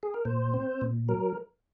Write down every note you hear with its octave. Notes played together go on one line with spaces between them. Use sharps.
G#4
A#4
A#2 C5
C4
A#2
F#3 A#4